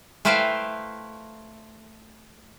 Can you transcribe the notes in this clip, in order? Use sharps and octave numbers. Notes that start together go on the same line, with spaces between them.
A3 E4 B4 C5 F5 G5